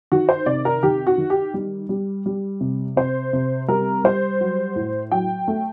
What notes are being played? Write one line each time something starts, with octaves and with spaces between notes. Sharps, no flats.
D#3 F#4
C5
C3 D5
A#4
D#3 G4
F#4
D#3
G4
G3
G3
G3
C3
C3 C5
C3
G3 A#4
G3 C5
F#3
A2
F#3 G5
A3